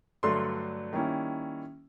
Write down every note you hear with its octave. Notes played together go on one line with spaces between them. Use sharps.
G2 D3 F#3 A3 C6
D#3 G3 A#3 C#4 E4